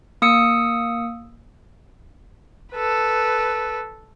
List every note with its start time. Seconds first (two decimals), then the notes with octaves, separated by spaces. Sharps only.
0.22 A#3 D#6 E6 C#7
2.73 A4 B4